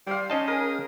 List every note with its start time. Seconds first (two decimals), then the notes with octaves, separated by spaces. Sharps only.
0.07 G3 C5 F5
0.30 C#4 D#4 D#5 A5
0.48 G#4 A#4